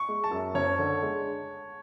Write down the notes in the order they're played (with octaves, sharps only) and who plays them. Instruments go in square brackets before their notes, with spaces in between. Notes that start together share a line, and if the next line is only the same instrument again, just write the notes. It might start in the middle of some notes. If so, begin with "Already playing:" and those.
Already playing: [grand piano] C#6
[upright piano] G#3
[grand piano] A5
[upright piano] F#2
[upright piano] F#1 [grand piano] C#5
[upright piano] D3
G#3